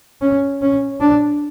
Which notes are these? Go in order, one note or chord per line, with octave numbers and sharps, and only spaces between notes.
C#4
C#4
D4